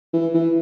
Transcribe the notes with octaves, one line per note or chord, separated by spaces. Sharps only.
E3
E3